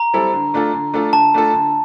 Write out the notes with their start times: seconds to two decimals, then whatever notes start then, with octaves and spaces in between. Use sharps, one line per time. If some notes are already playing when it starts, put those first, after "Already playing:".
Already playing: A#5
0.14 G3 C4 E4 A4
0.33 D3
0.54 A3 D4 F4 A4
0.73 D3
0.93 A3 D4 F4 A4
1.13 D3 A5
1.34 A3 D4 F4 A4
1.53 D3